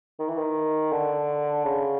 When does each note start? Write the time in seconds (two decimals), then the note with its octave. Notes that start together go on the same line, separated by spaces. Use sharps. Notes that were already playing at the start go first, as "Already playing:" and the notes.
0.19 D#3
0.28 E3
0.37 D#3
0.92 D3
1.65 C#3